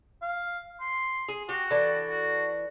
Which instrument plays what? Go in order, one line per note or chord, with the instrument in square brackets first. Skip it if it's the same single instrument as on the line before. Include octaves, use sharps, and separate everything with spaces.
[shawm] F5
C6
[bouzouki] G#4
[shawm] F#4 [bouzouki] G4
[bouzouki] E3 D4 A4
[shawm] F#4